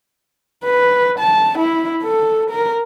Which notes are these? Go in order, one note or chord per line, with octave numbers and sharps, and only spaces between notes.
B4
A5
E4
A4
A#4